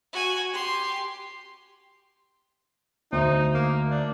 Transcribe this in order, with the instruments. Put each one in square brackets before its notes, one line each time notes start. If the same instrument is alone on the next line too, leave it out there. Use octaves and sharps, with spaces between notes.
[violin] F#4 G#5
G4 C6
[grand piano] D2 C5 [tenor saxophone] D#4
[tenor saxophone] A#3
D4